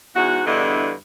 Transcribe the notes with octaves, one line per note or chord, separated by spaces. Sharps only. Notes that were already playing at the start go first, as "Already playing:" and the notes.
E2 G#2 F#4
E2 G2 D3 E4 D#5